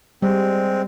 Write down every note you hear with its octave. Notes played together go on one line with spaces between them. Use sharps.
G3 G#3 C4